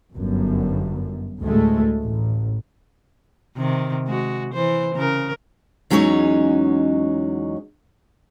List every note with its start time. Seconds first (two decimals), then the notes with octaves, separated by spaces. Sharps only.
0.14 G1 F#2
1.43 D2 A2 G#3 A3
2.02 A1
3.56 C3 D#3
4.07 G#3 F#4
4.54 E3 C5
4.95 C#3 A#4
5.90 E2 F#3 G#3 C#4 D#4 C#5